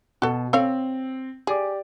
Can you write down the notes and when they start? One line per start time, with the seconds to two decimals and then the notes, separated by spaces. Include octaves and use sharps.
0.22 B2 F#4 A4
0.53 C4 A4 C#5 F5
1.47 G4 G#4 D5 D6